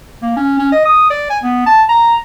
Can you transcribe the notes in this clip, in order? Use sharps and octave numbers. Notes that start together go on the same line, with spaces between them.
A#3
C#4
C#4
D#5
D#6
D5
G#5
B3
A5
A#5